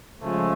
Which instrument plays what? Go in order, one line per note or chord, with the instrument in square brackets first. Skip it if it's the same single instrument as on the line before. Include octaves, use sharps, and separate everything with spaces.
[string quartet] C#3 F3 G#3 [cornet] A3